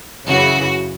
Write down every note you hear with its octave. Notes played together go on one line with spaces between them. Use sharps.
F#2 C#3 E3 F#4